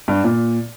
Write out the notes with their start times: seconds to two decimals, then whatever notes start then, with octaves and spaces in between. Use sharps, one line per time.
0.08 G2
0.24 A#2